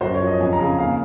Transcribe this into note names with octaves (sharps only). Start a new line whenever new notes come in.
F#2 C5
C#5
F3
D#5
F2 G#5
A#5
C#3
G#5
D#2 F5